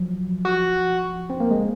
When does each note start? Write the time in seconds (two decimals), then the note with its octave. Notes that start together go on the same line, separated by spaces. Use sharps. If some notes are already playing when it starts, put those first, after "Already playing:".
Already playing: F3 F#3
0.45 F#4
1.30 C4
1.40 A#3
1.51 G#3